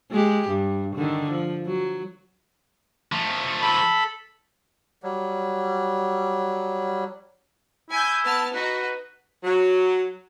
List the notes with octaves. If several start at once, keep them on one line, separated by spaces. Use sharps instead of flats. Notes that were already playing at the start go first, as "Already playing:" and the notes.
G#3 G4
G2
D3 D#3
F3
F#3
F3 A3
A4 B5
F#3 G3
E4 G#5 G6
B3 A5 F6
D#4 F#4 B4
F#3